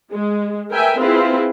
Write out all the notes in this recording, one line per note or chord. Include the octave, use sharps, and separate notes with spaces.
G#3
A#4 B4 E5 G5 G#5
C4 E4 F4 G#4 B4